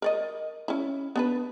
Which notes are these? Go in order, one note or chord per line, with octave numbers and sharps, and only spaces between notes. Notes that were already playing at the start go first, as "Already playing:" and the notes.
A#4 D5 D#5
C#4 E4
B3 D4 B4